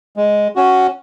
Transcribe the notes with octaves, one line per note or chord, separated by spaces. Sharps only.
G#3
C#4 F#4